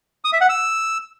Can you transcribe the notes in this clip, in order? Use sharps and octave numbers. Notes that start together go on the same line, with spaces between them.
D#6
E5
F#5
E6